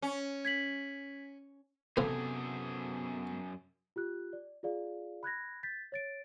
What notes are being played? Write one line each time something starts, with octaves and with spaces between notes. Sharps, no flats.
C#4
G#6 B6 F#7
F#2 A2 C3 B3 C4 F4 G#4 A4
F4 G4 F#6
D5
F4 G#4 D5 F5
B5 F#6 G#6 A#6
G6 A6 B6
C#5 A6 D7